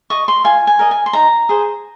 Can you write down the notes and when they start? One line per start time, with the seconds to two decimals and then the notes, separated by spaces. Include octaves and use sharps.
0.10 D#5 C#6
0.28 C6
0.44 F4 G#5
0.67 G#5
0.79 A#4 D#5
0.91 G#5
1.06 C6
1.13 D#4 A#5
1.49 G#4 C5